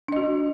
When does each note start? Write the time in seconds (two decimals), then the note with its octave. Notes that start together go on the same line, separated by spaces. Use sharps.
0.08 D4
0.12 D#5
0.16 F#4